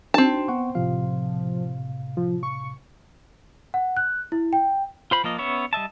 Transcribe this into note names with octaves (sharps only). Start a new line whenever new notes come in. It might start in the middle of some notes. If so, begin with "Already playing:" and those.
C4 D4 D#4 F#4 A5
B3 F#5 C#6
A2 C3 F3 F5
F3
C#6
F#5
F#6
E4
G5
F4 C5 B5
F3 A#3 F4 D#5
B3 C#4 C#5 E5
G3 D#5 E5 A5